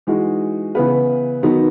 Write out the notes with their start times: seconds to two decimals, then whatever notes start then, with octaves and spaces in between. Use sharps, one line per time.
0.07 E3 G#3 D#4 F#4
0.75 C#3 E3 B3 E4 B4
1.43 D#3 F#3 B3 D#4